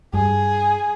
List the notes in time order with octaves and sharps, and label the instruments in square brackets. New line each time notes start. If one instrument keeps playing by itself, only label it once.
[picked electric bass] G2 [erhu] G#4